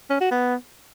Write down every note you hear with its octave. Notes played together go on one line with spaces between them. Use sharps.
C#4
F#4
B3